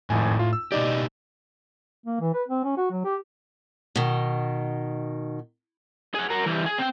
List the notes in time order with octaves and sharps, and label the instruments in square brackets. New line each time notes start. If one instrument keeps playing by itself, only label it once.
[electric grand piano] G#1 F2 G#5 [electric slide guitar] A2
[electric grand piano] F4
E6
[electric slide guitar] B2 D#4 G4 [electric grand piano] D5 D#5 D6
[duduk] A#3
E3
B4
C4
C#4
F#4
F#3
G4
[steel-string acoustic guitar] B2 D#3
[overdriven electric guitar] G#4 F#5
F#4 A#4
E3 G3
G#4
C4 G5